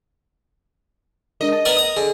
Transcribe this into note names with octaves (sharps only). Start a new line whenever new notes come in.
G#3 D4 A#4 D#5
A5
B3 A#4 D5
A#5 D#6
D3 G#4 D5